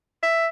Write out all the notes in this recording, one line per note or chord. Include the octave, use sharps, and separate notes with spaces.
E5